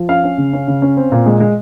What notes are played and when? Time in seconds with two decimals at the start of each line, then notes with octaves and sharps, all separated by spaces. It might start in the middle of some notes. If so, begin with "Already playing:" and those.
Already playing: F3
0.09 C#4 F5
0.24 C#4
0.38 C#3
0.53 C#4
0.68 C#3
0.82 C#4
0.97 C4
1.12 A#2
1.26 G#3
1.40 G#3